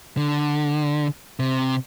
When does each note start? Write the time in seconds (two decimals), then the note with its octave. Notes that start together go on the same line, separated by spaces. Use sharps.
0.17 D3
1.39 C3